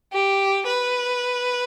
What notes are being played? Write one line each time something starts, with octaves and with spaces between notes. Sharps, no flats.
G4
B4